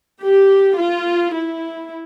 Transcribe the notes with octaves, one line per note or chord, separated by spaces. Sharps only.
G4
F4
E4